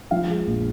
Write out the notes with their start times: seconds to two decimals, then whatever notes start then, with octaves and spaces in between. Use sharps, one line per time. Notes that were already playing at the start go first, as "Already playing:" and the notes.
0.11 F3 F5
0.29 G#3
0.47 A#1